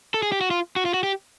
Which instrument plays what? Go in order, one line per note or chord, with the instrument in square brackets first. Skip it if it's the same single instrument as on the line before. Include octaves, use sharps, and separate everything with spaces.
[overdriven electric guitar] A4
G#4
G4
F#4
F4
F#4
F4
F#4
G4